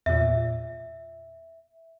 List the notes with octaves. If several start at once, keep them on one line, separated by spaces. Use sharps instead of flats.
E2 A#2 E5